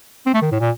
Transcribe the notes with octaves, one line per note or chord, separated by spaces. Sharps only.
C4
A3
D#3
A2
A#2